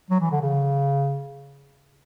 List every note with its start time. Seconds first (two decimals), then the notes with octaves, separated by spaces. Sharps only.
0.10 F#3
0.20 E3
0.31 D3
0.41 C#3